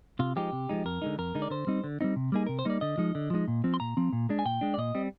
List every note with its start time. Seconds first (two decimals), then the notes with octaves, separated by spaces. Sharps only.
0.19 C3 F4
0.36 F3 G#3 D#4 G4
0.52 C3
0.69 F3 G#3 D#4
0.85 F2 A#4
1.02 D3 G#3 D#4
1.18 F2 A#4
1.35 D3 G#3 D#4
1.42 D5
1.50 D3 C5
1.67 G3 C4 D#4
1.84 D3
2.01 G3 C4 D#4
2.16 C3
2.32 G3 A#3 D#4 G#4
2.47 C3 A#4
2.59 C5
2.65 G3 A#3 D#4 D5
2.81 D3 D#5
2.98 F3 G#3 D#4
3.15 D3
3.30 F3 G#3 D#4
3.48 A#2
3.64 F3 C4
3.74 C6
3.80 A#2 A#5
3.97 F3 C4
4.13 A#2
4.29 G#3 D4
4.39 G#5
4.45 A#2 G5
4.61 G#3 D4
4.74 D5
4.78 A#2 D#5
4.95 G3 C4